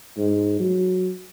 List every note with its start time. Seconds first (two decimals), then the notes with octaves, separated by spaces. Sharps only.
0.18 G#2
0.60 F#3